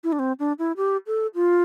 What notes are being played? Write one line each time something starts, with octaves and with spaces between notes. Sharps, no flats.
E4
D4
C4
D4
E4
G4
A4
F4